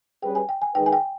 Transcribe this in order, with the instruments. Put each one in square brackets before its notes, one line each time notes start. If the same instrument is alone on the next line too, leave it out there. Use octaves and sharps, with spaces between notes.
[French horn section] G3 C#4 G#4 B4 [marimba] G5
[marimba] G#5
G5
G#5
[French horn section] D#3 G#3 D#4 G#4 B4 [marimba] G5
[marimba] G#5
G5